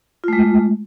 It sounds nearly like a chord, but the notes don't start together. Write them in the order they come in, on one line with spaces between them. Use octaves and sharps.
F4 A3 G#3